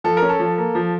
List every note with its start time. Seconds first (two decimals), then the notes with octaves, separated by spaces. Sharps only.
0.04 F3 A4
0.17 A#4
0.22 C#4
0.29 A4
0.39 F3
0.58 A#3
0.75 F3